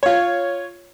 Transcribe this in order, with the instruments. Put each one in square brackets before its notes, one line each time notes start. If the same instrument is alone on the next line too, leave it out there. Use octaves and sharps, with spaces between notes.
[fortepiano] F4 C#5